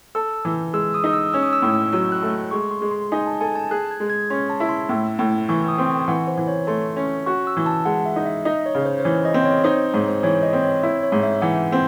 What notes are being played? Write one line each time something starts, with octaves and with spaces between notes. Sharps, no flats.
A4 E6
E3
G#3 E6
D#6
D#4
E6
C#4 E6
D#6
E6
A2
F#3 E6
F#6
A3
G#3 C#6
C6
G#3
C6
D#4 G#5
A5
A4 G#5
A5
G#4 F#6
G#6
G#3
G#6
C#4 C6
A5
E4
C6
A2
A2
E3 C#6
D#6
C4
C#6
E3 F#5
C5
E3
C#5
A3 C6
C#4
F#4 C#6
E6
E3
A5
G#3 F#5
E5
D#4
E5
D#4 D#5
C#5
C#3
C5
C5
E3 C#5
D#5
C4
C#5
D#4 C5
G#2 C#5
C5
E3 C#5
D#5
C4
C#5
E4
C#5
G#2
E5
E3 F#5
C4